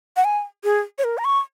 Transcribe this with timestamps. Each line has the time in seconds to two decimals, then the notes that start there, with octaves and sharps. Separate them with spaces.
0.17 F#5
0.25 G#5
0.64 G#4
0.98 C#5
1.04 A#4
1.18 A#5
1.25 C#6